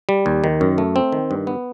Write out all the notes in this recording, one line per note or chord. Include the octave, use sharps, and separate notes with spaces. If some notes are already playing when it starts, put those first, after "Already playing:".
G3
D#2
D#3
F#2
A3
C4
D#3
G2
B3